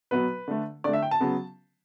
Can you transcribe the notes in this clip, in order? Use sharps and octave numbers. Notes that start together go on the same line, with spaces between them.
B2 F#3 B3 B4
D3 A3
D3 A3 D5
E5
G5
A5
C#3 F#3 B3